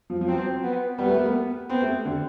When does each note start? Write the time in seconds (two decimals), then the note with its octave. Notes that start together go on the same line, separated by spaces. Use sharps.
0.10 F3
0.21 F3
0.28 F#3 C4
0.63 B3
0.98 G3 B3
1.08 A3
1.17 A#3
1.25 B3
1.69 B3 C4
1.82 A3
2.05 D3